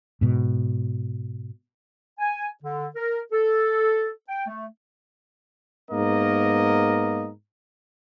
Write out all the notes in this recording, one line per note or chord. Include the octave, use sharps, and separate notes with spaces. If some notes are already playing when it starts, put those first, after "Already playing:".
G#2 B2
G#5
D3
A#4
A4
G5
A3
G#2 A#3 B3 A#4 D#5